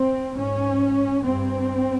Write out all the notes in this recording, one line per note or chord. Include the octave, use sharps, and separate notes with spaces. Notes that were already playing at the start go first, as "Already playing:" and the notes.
Already playing: C4
G#2 C#4
G2 C4